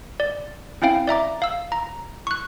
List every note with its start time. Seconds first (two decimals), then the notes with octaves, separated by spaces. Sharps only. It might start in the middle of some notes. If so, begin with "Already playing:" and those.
0.20 D5
0.82 C4 C#4 E4 F5 G5
1.07 D5 E5 A#5 D6
1.42 F5 E6
1.72 A#5
2.27 C#6 F#6